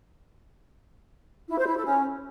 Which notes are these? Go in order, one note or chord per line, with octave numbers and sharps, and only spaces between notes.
E4
C5
E4
A4
C#4